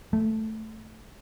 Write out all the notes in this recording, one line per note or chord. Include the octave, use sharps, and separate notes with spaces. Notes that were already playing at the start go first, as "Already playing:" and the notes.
A3